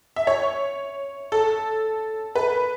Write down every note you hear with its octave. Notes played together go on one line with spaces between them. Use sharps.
E5
C#5
A4
B4